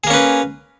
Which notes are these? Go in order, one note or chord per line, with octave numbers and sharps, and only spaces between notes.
A#3 C#4 G#4 B4